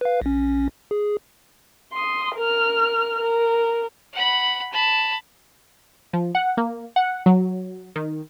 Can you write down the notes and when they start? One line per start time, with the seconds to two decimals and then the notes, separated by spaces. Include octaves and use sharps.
0.01 B4 F5
0.22 A#1 C#4
0.91 G#4
1.93 C6 D#6
2.36 A#4 F6
3.20 A#4
4.13 F#5 B5
4.72 A5 B5
6.13 F3
6.35 F#5
6.57 A#3
6.96 F#5
7.26 F#3
7.96 D#3